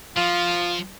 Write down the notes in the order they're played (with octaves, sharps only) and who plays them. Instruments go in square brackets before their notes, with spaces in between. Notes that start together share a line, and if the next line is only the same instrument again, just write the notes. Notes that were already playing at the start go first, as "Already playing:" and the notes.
[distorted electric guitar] F3 [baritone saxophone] F4